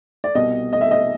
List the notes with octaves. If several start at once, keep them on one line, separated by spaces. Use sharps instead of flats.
D5
C2 B2 D#5
D#5
E5
D#5